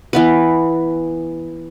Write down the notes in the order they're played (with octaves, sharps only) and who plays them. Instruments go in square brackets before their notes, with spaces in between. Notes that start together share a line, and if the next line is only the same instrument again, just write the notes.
[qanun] E3 B3 B4